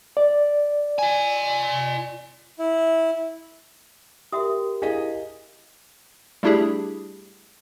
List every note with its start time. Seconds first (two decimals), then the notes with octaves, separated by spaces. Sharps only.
0.17 D5
0.99 F4 G#5
2.59 E4
4.32 F#4 G4 A#4 E5 D#6
4.82 D4 E4 G#4 D#5 F5
6.43 G3 A3 D4 E4 G4 G#4